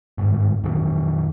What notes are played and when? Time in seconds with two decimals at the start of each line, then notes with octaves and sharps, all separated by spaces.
0.18 G1 G#2
0.64 F2 A#2 D#3 F#3